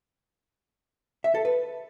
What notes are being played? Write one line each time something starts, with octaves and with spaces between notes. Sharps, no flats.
E5
A4
B4